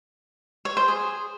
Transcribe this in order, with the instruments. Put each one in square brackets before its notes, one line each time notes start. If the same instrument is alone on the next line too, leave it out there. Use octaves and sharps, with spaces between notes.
[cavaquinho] C#5
C5
G#4